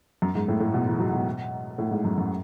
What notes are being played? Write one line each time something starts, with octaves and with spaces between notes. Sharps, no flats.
F#2
G#2
A2
A2
B2
E3
F#3
B2
A2
G#2
F#2
F#2